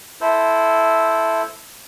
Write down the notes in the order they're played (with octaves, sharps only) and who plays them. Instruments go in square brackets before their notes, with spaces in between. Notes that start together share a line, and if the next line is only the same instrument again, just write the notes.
[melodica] E4 A4 C5